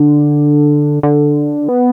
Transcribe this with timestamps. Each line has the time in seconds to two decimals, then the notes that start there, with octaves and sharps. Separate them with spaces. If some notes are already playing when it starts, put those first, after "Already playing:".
Already playing: D3
1.03 D3
1.69 B3